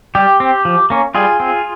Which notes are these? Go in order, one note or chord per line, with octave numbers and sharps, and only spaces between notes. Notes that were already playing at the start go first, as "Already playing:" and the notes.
G3 G4
C4
F3
A#3 C#4
G3 F4 G#4
C4